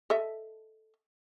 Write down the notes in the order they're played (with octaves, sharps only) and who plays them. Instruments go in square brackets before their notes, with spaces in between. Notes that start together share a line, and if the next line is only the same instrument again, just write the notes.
[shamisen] A4 D#5 E5